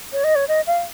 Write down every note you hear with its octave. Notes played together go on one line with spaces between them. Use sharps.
C#5
D#5
C#5
D#5
F5